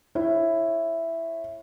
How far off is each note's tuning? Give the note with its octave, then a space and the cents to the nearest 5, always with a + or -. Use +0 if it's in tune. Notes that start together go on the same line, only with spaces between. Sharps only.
E4 +5 C#5 -25